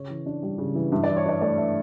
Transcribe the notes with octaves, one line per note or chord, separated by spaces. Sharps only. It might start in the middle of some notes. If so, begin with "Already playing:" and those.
Already playing: C#3 C#5
E3
D4
G3
C#3
E3
G2 E5
E3 D5
C#5
D4 D5
A3 D5
E5